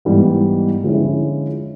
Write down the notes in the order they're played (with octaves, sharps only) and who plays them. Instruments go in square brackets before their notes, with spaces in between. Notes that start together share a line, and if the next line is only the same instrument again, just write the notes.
[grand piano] G#2 E3 G3 B3
D3 F3 G#3 C#4 E4